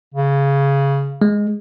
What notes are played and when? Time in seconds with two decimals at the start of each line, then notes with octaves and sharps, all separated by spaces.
0.14 C#3
1.22 G#3